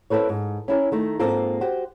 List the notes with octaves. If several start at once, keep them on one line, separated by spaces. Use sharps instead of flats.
C4 E4 G#4 A4 B4 C#5
G#2
C#4 E4 A#4
D#3 A3 D#4
G#2 A#3 C4 F4 A4 A#4
F#4 G4 C5